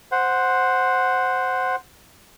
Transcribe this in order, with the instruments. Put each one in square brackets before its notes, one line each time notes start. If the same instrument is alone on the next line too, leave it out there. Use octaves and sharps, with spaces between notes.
[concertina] C5 F#5